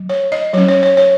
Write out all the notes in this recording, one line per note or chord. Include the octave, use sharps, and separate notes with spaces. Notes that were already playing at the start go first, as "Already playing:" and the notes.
Already playing: F#3
C#5
D#5
F#3 C#4 C#5
C#5
C#5
C#5